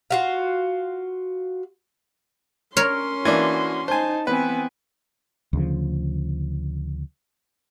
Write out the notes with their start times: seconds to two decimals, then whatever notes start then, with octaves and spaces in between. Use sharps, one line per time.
0.11 F4 F#4 F5
2.77 C#4 A#4 C#5 C6
3.25 E3 A#3 D4 F#4
3.88 D#4 C5 G#5 A5
4.27 E3 B3 C4 B4 G#5
5.53 D2 C#3 F3